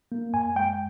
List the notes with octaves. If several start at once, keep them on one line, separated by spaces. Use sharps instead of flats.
A#3
F#2 G#5
G#3 G5